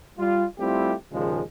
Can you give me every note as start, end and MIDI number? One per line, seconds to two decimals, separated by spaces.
0.18 0.45 55
0.18 0.45 65
0.59 0.93 55
0.59 0.93 57
0.59 0.93 60
0.59 0.93 64
0.59 0.93 65
0.59 0.93 67
1.12 1.41 39
1.12 1.41 46
1.12 1.41 49
1.12 1.41 53
1.12 1.41 56